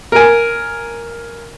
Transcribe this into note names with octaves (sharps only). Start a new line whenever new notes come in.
A#4 G#5